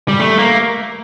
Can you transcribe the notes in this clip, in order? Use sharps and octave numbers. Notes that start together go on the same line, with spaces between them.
G3
A3
A#3